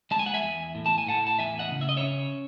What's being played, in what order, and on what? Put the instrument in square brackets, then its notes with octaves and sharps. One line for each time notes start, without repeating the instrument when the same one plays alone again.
[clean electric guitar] G#3 A5
G#5
F#5
E5 G#5
E2
A2
A5
G#5
A2 F#5 A5
A5
E2 E5 G#5
D#5 F#5
C#3
E5
D#5
C#5 E5
C#4